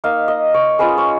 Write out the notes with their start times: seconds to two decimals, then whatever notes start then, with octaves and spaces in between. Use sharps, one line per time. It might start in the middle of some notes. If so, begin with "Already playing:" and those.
0.04 A#3 D#4 F5
0.28 D#5
0.54 C#5
0.79 G#3 C#4 F4 B4
0.98 C#5